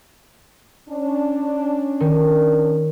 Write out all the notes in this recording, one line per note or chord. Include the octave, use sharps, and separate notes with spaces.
C#4 D4
D#3